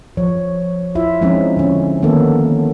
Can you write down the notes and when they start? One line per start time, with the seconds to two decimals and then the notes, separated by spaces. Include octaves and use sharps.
0.17 F3 C#5
0.95 E4 F4 E5
1.22 F3 G#3 C4 C#4 D#4
1.57 D3 C#4
2.02 D#3 A#3 B3 C#4 A4